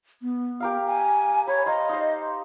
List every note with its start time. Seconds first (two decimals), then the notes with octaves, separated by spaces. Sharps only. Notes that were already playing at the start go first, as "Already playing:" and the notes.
0.22 B3
0.60 G4 A#4 F5
0.86 G#5
1.47 B4 C#5
1.66 C5 D#5 F5 A#5
1.89 D#4 C5